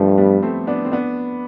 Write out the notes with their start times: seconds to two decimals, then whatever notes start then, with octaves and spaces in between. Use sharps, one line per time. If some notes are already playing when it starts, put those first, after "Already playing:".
Already playing: G2 F3 A3
0.18 G3 B3
0.43 A3 C4
0.67 B3 D4
0.85 C4
0.92 B3 D4